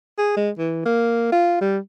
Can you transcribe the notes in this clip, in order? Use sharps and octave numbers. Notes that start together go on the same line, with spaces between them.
G#4
G#3
E3
A#3
F4
G3